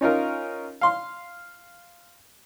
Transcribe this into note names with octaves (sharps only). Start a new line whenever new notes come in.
C#4 D#4 F4 A#4
F5 C6